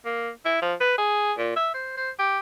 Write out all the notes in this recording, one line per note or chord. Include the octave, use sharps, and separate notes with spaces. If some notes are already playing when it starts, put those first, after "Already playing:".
A#3
E4
F3
B4
G#4
A#2
E5
C5
C5
G4